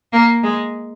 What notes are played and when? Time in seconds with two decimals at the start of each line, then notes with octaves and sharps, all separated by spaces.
0.13 A#3
0.44 G#3